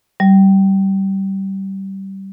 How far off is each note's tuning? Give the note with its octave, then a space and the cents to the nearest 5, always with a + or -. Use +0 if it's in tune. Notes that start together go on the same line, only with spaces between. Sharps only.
G3 -20